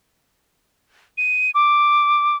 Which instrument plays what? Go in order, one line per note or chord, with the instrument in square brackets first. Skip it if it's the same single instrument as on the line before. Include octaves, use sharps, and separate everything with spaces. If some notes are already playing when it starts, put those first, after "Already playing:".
[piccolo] D#7
D6